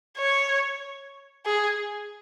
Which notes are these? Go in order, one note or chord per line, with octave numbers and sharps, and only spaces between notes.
C#5
G#4